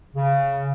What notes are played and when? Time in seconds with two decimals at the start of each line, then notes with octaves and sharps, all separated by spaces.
0.15 C#3